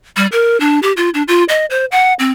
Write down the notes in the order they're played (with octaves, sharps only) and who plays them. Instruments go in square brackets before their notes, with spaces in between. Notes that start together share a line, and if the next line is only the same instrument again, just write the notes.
[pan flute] G3
A#4
D4
G4
F4
D4
F4
D#5
C5
F#5
C4